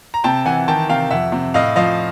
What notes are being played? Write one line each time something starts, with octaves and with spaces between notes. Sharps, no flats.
A#5
C3 G5 A5
E3 F#5 G#5
D#3 G5 A5
C3 F5 G5
F2 E5 F#5
C3
A2 D#5 F5
F3 D#5 F5